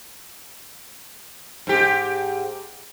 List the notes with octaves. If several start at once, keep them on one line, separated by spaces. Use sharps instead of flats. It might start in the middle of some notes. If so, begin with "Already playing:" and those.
G#2 G4